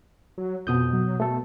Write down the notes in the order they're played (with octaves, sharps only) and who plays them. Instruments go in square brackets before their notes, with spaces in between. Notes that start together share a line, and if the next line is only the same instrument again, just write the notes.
[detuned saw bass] F#3
[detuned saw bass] F2 [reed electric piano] B2 D#6 G6
[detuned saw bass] F#3
[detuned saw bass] B2 [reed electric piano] A3 A4